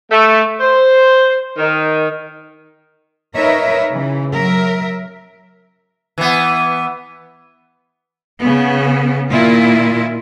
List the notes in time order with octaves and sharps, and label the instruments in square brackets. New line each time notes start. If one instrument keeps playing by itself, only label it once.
[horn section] A3
C5
D#3
[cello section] D#4 A#4 B4 C#5 D#5 E5
C#3 E3
F#3 A#4 E5
[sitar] E3 B3
[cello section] C#3 B3
A#2 D#3 E4 F4